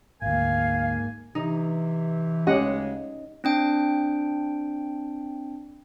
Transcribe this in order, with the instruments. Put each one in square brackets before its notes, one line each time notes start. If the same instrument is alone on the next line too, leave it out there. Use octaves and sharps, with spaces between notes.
[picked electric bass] G#1 D2 [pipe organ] G#2 A#3 [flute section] F5 [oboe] G#5
[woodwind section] C3 E3 [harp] D#4
[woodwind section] D2 C#3 G#3 [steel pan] C#4 G4 F#5 [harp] D#5
[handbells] C4 D4 G5